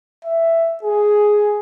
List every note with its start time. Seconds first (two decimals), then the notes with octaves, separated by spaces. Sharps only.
0.25 E5
0.83 G#4